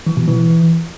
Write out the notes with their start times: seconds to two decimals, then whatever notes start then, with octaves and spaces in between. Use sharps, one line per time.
0.07 E3
0.17 B2
0.28 E3